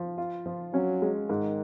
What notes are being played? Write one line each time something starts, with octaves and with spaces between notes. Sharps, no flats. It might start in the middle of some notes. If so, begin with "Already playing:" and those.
Already playing: F3
F4
F3
F#3 C#4
G#3
G#2 D#3